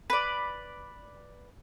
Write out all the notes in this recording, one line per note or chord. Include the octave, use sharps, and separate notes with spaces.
B4 D5